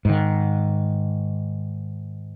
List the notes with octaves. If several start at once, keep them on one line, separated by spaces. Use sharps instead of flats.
G#2 D#3